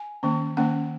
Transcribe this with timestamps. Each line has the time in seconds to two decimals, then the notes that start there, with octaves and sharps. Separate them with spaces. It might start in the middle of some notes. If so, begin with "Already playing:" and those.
Already playing: G#5
0.23 D#3 A#3 C#4
0.57 D#3 A#3 C#4 F#5